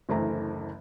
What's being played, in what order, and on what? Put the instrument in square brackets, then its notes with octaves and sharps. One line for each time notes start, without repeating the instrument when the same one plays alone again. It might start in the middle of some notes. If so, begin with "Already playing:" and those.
[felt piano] F#1 D2 E3 A3 C5 A#5